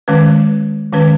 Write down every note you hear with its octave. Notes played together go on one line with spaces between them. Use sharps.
D#3 G#3 C#4 B4
D#3 G#3 C#4 B4